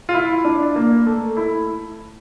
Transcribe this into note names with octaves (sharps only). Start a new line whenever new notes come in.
F4
E4
D4
A#3
A3
E4